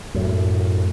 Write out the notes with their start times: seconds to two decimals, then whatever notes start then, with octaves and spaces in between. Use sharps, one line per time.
0.14 F#2 A2